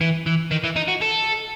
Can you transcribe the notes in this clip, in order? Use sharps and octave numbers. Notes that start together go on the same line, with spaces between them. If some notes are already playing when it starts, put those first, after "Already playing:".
E3
E3
D#3
E3
D#4
F#4
A4